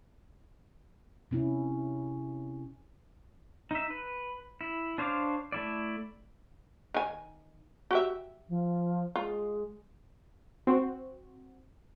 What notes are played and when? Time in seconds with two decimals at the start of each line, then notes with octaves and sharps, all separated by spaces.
1.31 C3 C#4 E4
3.71 D#4 E5
3.90 B4
4.61 E4
4.98 D4 C5 C#5 F5 D6
5.52 A3 E4 D5
6.94 D#3 G#5
7.91 F#4 G4 E5
8.48 F3
9.16 G#3 F4
10.67 C4 F#4